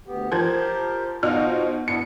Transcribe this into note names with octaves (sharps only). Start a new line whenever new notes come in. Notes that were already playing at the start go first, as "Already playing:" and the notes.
D2 B3 G4
F3 G4 A#4 C5 G#6
B2 D#4 F4 F#4 C5 F6
B3 D4 E4 C#7